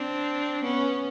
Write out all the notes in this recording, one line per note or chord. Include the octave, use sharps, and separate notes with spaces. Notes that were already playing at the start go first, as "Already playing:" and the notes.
Already playing: C4 D4
B3 C#4